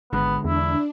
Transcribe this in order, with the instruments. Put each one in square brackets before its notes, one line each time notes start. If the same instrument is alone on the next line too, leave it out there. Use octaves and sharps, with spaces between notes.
[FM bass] G#1 [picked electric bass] D3 G#3 [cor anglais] B3
[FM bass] E2 [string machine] D4 [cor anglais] E4